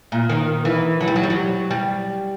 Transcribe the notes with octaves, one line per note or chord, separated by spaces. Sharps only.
A#2
D#3
E3
F#3
G3
F#3
G3
F#3
G3